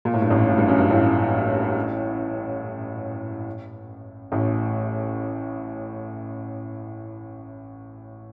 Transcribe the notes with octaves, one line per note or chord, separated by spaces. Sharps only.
A#2
A2
G2
A1 A2
A2
G2
F#2
G2
A1 A2
A1 A2